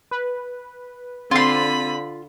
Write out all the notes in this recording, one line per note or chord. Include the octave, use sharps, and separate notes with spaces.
B4
D3 C4 F4 B5 C6